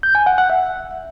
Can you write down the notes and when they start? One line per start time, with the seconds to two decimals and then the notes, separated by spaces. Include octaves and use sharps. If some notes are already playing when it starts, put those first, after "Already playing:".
0.03 G6
0.15 G#5
0.26 F#5
0.38 F#5
0.50 E5